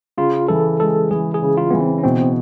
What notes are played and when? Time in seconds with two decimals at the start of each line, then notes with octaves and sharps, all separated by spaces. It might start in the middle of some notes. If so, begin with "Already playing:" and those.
0.18 C#3 F4
0.48 E3 A4
0.79 G#3 A4
1.11 E3 G#4
1.34 G#4
1.42 C#3
1.58 F4
1.70 E3 B3
1.81 C4
1.98 C#4
2.03 B2 C4